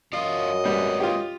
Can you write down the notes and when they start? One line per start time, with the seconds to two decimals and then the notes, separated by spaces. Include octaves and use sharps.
0.13 F#2 F#3 F4 D#5 F5
0.65 G3 G#3 C4 B4
1.00 F4 G4